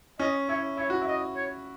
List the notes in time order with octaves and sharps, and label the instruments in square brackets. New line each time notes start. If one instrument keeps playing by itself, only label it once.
[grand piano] C#4 [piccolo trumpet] D#5
[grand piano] E4 [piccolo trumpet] C#5
[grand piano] E4 [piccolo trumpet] C#5
[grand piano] F#4
E4
[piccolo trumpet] D#5
C#5